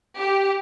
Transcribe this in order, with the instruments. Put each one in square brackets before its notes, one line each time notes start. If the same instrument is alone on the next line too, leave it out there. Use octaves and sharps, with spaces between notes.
[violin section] G4